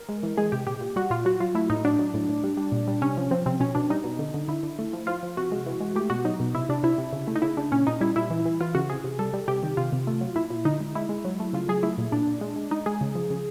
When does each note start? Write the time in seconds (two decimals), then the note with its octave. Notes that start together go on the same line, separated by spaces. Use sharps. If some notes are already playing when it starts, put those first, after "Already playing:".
Already playing: A#4
0.09 G#3
0.23 E3
0.37 G#3 G#4
0.52 C3 G4
0.67 A#2 G4
0.81 A#2
0.96 G3 F#4
1.10 A#2 F4
1.25 F#3 F#4
1.40 F#3 F4
1.55 A3 E4
1.70 A2 D#4
1.84 F#3 D4
1.99 F#3
2.14 A2
2.29 A2
2.44 G3
2.57 G3
2.72 A#2
2.88 G3
3.02 C3 C#4
3.17 F3
3.31 F3 C4
3.46 C3 C4
3.60 B2 C#4
3.75 B2 D4
3.90 G3 D#4
4.04 B2
4.19 D3
4.34 D3
4.48 D3 E4
4.63 D3
4.79 A3
4.93 F3
5.07 F3 F4
5.23 F3
5.37 C3 F#4
5.52 G#3
5.66 E3
5.81 G#3
5.96 A3 G4
6.10 B2 F#4
6.25 F#3 D#4
6.40 B2
6.55 C3 E4
6.69 C3 D4
6.83 C3 E4
6.98 C3
7.13 C#3
7.28 A3
7.36 D#4
7.42 C#3 E4
7.57 C#3 D4
7.72 A#2 C#4
7.87 A#2 D#4
8.01 G3 E4
8.16 A#2 E4
8.30 E3
8.45 E3
8.61 E3 F4
8.75 C#3 F#4
8.90 C3 G#4
9.04 C3
9.19 G3 A4
9.33 G3
9.48 C3 G4
9.63 D#3
9.77 C3 F4
9.92 C3
10.07 A3
10.21 F#3
10.36 A#2 E4
10.50 A#2
10.65 D3 D#4
10.80 G#3
10.95 G#3 E4
11.09 G#3
11.25 F#3
11.40 A3
11.53 C#3 F4
11.69 F#3 G#4
11.83 A3 E4
11.98 A#2
12.12 A#2 D4
12.27 A#2
12.41 G#3
12.56 G#3
12.71 G#3 D#4
12.86 G#3 G#4
13.01 C#3
13.15 F3
13.30 C#3